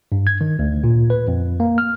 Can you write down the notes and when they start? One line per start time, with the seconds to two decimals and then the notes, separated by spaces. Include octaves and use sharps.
0.12 G2
0.27 G#6
0.41 D#3
0.59 D2
0.84 A#2
1.10 B4
1.28 F2
1.60 A#3
1.78 F6